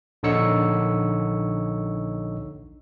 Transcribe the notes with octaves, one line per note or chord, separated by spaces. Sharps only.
A#1 D3 D#4 C#5 E6 C#7